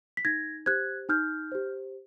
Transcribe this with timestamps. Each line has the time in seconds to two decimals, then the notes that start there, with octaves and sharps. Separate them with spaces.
0.17 B6
0.25 D#4 G#6 A#6
0.66 G4 C5 F#6 G#6
1.09 D#4 F6 G6
1.52 G4 C5